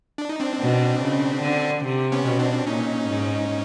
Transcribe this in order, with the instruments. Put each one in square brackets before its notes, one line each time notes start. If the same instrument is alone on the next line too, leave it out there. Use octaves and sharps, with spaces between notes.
[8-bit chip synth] D4
D#4
C4 D4
[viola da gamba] B2
C#3
D3
C3
[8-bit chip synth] B3 C#4
[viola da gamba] B2
[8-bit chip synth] C4 D4
[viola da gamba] A#2 [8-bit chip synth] C#4 D#4
[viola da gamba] G#2